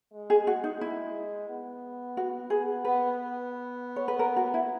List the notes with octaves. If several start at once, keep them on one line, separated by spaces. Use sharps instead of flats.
G#3
G#4
F#4
D#4
E4
B3
F#4
G#4
B3 B4
C#5
B4
A#4
F#4
E4